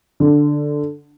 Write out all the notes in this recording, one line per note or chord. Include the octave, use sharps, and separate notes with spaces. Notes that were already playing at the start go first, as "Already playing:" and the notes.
D3